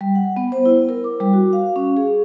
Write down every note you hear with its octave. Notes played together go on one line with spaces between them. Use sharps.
G3
F#5
B3
C5
E4
A#4
D6
G3
F#4
F5
C#4
G#4